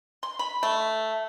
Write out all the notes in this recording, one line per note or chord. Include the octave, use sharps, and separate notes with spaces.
C6
B5
A3